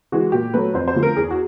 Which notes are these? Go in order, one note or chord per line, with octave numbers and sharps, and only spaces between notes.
E3 G#3 F#4
A#2 G4
F#3 A3 B4
F2 C5
C5
D3 F3 A3
A#4
E2 G#4
F#4